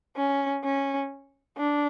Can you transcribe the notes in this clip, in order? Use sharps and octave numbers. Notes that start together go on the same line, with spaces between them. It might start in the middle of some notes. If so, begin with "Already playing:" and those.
C#4
C#4
D4